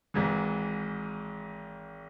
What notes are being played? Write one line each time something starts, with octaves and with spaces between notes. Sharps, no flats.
G#1 G#2 E3